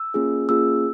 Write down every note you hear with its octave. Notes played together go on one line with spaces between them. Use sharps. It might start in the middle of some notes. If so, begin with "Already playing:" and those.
Already playing: E6
A#3 C#4 F4 G#4
A#3 C#4 F4 G#4 E6